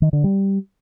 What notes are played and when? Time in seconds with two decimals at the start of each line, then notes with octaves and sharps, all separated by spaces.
0.02 D#3
0.13 D3
0.24 G3